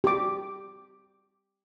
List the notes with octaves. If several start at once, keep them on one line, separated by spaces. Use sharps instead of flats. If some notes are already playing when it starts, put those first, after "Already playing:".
G4 D6